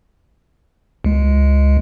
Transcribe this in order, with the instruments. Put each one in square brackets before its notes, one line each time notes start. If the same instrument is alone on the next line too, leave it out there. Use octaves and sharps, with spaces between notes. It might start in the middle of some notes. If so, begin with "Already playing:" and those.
[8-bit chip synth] C#2 G#3